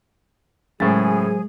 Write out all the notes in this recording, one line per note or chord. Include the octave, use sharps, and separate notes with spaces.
A2 C#3 F#3 G#3 G#4 A#4 C5 A6